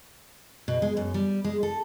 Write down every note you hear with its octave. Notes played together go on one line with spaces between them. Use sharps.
B2
G#3
F#2
G3
G#3
A4